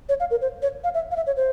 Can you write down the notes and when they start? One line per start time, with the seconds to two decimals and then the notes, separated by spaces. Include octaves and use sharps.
0.09 C#5
0.20 F5
0.31 A#4
0.42 C5
0.62 C#5
0.84 F5
0.94 E5
1.11 F5
1.16 E5
1.27 C#5
1.37 C5